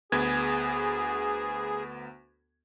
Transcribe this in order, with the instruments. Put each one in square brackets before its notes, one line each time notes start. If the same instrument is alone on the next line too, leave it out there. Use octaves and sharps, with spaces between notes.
[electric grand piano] D2 B3 G#6 [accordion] G#4